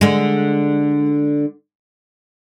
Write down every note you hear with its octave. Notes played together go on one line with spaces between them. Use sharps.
D3 G#3